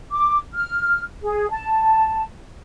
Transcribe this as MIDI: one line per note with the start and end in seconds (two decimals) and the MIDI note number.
0.12 0.39 86
0.54 1.01 89
1.23 1.47 68
1.51 2.22 81